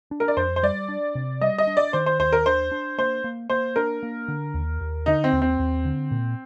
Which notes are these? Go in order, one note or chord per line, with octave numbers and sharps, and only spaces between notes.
D4
A#4
D5
F2 C5
C5
G3 D5
D4
C3
G3 D#5
D#5
D4
D5
D#3 C5
C5
D#2 C5
A#4
D4 C5
D4
A#3 C5
A#3
A#3 C5
D4 A#4
A#3
D3
D#2
D#2
D3 D#4
C4
D#2
C4
D#2
D3
A#2